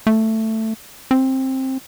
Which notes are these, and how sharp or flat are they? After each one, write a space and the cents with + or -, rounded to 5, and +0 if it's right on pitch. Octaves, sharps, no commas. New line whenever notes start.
A3 +10
C4 +15